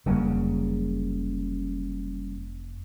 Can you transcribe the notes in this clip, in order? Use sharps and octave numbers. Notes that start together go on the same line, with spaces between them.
F1 F2 C#3 F#3 G3 A#3